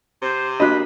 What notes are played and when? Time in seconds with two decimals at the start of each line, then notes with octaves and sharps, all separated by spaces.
0.22 C3 C5
0.60 A#3 D4 F#4 D#5 B5 F#6